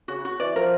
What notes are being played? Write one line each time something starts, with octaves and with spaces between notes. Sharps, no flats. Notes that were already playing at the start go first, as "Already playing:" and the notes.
C#3 F#4
F#4
E3 D5
F3 A#4